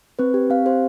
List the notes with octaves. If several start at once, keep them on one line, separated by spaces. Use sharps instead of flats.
C4 B4
G4
C4 F5
G4 C5